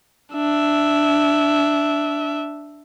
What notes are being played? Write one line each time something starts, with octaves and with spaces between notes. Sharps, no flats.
D4 E5